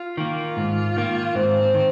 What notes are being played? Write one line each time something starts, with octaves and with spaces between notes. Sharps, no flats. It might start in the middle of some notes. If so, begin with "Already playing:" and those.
Already playing: F4
D#3 A#3
G#2
D#3 A#3
G#2 C4
D#3